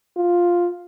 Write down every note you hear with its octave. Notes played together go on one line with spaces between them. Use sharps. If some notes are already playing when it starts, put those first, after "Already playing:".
F4